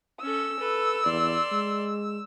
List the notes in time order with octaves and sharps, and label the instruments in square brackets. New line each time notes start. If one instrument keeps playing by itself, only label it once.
[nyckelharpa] C#4 A4 [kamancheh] E6
[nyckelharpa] A4 B4
[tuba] E2 [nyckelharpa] D5 C6
[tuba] G#3